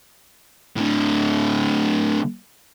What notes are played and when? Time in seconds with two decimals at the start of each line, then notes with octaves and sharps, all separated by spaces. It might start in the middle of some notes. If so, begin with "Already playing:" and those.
0.76 A2 D3